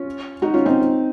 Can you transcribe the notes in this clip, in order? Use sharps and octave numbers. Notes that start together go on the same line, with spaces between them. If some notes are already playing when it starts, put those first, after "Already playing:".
Already playing: C#4 F4
D#4 F#4
C#4 F4
C4 D#4